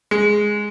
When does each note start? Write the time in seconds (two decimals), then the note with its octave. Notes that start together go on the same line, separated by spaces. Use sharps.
0.11 G#3